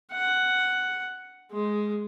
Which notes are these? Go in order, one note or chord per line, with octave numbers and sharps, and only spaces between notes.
F#5
G#3